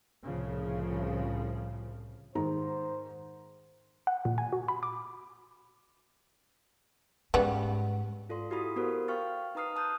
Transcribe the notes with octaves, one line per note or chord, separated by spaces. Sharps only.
C2 A2 C#3 F3
G#2 D#3 C5 A#5
F#5
A#2
G#5
F#4
B5
D6
G#2 C#3 G3 B3
F4 A4 D5 C6
E4 F#4 G4 A4 B5 D#6
B3 F#4 A#4 C5
F5 G5 C#6 F6 A6
D#4 B4 A#5 D#6 F6 C7
A5 D#6 F#6 G6